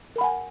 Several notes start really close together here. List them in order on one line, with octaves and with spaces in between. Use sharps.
A#4 B5 F#5 G#5